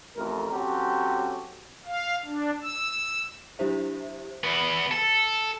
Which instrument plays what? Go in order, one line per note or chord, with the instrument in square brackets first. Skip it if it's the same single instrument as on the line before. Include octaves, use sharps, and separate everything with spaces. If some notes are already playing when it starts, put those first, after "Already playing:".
[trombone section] A1 F2 A3 A#4
F#3 C4 C#4 F#4 G4 A4
[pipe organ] F5
D4
E6
[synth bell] F#3 D4 E4 G4 C5 E5
[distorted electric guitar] E2 B3
A4